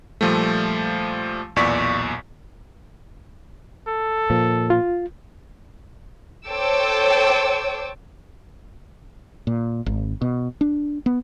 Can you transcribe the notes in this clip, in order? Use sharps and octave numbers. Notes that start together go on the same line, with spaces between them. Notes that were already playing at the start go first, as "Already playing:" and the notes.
A#2 F3 G3 A3
B1 E2 A#2 D5 C#6 B6
A4
A#2 F3
F4
A4 C5 C#5 G5 D6 E6
A#2
G#1
B2
D4
B3